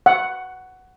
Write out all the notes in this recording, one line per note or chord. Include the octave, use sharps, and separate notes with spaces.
F#5